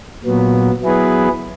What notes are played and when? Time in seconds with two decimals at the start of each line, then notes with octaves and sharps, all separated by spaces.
0.24 A#2 F#3 B3
0.82 F#3 B3 E4 G#4 B4